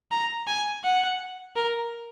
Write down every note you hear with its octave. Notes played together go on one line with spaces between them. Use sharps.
A#5
G#5
F#5
A#4